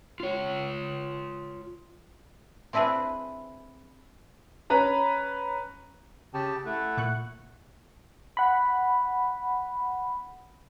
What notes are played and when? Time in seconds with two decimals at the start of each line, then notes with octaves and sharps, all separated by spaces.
0.20 F4 C#5
2.73 C4 D4 E4 G#4 B4
4.70 C#4 B4 A#5 B5
6.34 C#3 G4 G5 A5
6.65 A3 E4 F#5
6.97 A#2 C#6 F#6
8.37 F#5 B5